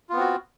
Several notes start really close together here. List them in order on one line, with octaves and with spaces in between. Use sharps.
F4 B3 C4 F#4